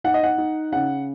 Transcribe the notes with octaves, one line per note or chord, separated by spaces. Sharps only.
D#4 F#5
D#5
F#5
D#4
C#3 F#5